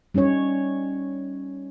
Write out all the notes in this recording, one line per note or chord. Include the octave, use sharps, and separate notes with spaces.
G3 C#4 D#4 C#5